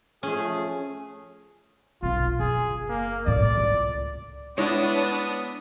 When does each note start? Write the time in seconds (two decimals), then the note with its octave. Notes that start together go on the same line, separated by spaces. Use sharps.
0.23 F3 A3 C#4 G#4
2.03 F1 B1 F4
2.40 F#1 G#4
2.89 A#3
3.26 C2 A2 D5
3.57 C#2
4.58 G#3 B3 D4 E4 C#5 D#6